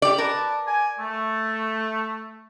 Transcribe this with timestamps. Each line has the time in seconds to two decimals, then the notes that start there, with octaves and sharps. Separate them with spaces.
0.02 G4 D5
0.18 A#4 B4 D5 A5
0.66 D5 G#5
0.99 A3